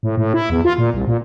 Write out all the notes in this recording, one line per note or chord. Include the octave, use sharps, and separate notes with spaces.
A2
A2
E4
E2
F4
A#2
C2
A#2